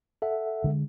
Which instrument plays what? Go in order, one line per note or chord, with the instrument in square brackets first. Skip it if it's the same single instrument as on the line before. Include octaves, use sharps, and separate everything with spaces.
[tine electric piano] A4 E5 F#5
[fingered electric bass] D3 G#3